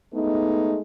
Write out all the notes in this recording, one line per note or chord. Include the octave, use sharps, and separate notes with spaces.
G#3 A3 B3 D#4